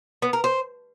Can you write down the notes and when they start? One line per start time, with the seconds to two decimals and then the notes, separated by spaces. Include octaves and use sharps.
0.22 B3
0.33 A#4
0.44 C5